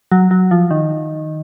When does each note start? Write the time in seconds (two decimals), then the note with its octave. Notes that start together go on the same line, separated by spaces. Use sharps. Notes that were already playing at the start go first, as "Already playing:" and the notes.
0.12 F#3
0.31 F#3
0.51 F3
0.71 D#3